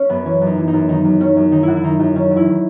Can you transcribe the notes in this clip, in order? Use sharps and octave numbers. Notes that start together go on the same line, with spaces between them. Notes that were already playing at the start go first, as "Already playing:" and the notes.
Already playing: C#4
F#2 B3
E3 C#4
F#2
D#4
E3
D#4
F#2
D#3 D#4
F#2
D#3 C#4
F#2
D#3 D#4
F#2 E4 F#4
E4
D#3 D#4
F#2 D#4
D#3 C#4
E2
E4
D#3